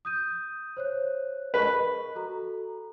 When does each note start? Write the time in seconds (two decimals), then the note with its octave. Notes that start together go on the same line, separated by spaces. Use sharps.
0.05 D#6 G6 D#7
0.77 C5 C#5 F#6
1.54 A#4 B4 D#5 C#6
2.15 F#4 A4 A#5